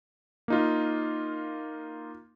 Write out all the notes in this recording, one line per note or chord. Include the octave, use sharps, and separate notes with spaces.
A#3 D#4 F4